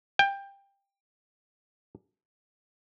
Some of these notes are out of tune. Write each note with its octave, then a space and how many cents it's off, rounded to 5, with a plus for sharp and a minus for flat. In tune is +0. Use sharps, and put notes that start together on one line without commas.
G5 +15